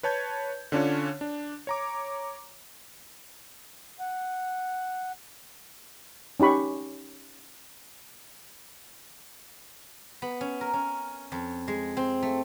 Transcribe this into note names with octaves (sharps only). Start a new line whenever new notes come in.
B4 C#5 A5 G6 G#6
D3 C#4 D4 F4 C#5
D4
C#5 A#5 D6
F#5
C#4 D#4 G4 B5 C#6
B3
C#4
A#4
C#4
F2
G#3
C4
A3